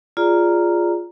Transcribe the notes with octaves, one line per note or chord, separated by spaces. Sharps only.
F4 G#4 D5 A#5